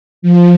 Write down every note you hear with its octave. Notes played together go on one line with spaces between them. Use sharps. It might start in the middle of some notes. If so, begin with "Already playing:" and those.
F3